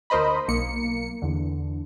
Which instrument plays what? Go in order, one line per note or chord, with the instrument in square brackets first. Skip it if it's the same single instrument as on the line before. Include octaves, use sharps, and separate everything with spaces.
[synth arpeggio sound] D2 A#4 C5 D#5 B5
B1 A#3 C#7
E2 D3